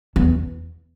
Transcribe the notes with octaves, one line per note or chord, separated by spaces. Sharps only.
E2